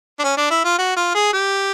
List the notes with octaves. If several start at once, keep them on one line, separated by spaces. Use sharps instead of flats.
D4
C#4
D4
E4
F4
F#4
F4
G#4
G4